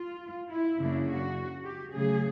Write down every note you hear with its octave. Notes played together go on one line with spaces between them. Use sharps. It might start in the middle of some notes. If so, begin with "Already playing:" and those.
Already playing: F4
E4
F#2 C#3 F#3 A#3 D4
F#4
G4
C#3 F#3 A3 G#4